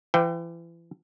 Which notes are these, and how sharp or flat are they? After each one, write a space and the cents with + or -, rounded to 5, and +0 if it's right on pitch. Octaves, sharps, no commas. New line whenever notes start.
E3 +35 G5 +0